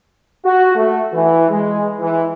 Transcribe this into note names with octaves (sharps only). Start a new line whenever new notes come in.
F#4
A3
E3
G#3
E3